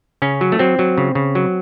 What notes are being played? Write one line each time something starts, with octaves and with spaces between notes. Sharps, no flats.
C#3 C#4
F#3
A3
F#3 C4
F#3
C#3
C#3
F#3